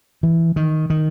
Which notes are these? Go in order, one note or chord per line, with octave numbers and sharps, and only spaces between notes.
E3
D#3
D#3